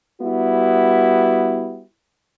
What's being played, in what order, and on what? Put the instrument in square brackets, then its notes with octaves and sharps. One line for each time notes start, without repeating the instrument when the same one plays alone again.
[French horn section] G3 B3 E4 F#4